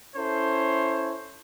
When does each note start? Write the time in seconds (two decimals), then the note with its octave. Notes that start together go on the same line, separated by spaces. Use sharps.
0.16 C#4 E4 A4 C5 C#5